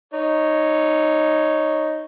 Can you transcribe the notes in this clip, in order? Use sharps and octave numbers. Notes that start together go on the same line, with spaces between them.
D#4 C#5